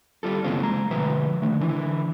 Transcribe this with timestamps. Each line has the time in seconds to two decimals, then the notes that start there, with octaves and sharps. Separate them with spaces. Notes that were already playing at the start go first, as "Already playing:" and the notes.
0.23 G3 F4 A4
0.44 F#2 C#3 E3 A#3 C4 F4
0.63 G#3 A#5
0.90 D2 B2 F3 B4 E5
1.42 D3 D#3 A3
1.61 D3 E3 E4